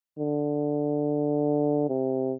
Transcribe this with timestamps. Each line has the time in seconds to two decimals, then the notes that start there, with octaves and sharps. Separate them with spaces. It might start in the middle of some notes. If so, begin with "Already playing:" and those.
0.19 D3
1.89 C3